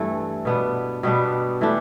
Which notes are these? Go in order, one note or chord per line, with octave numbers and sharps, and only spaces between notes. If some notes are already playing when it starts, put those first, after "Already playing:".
Already playing: G2 E3 A3
B2 B3 D4
B2 G3 B3 D4
E3 A3 D4 G4